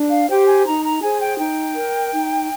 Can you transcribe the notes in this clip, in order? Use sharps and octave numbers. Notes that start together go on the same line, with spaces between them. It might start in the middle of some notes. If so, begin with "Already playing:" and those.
Already playing: D4
F5
G4 C5 G5
G#5
D#4 A#5
A#5
G#4 C5 G#5
G5
D#4 G5
A#4
D#4